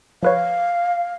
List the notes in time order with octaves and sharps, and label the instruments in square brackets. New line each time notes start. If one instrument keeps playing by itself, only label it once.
[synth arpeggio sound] F3 B4 C#5 [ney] F5